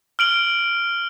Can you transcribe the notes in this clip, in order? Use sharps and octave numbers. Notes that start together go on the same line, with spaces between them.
F6 D7 F#7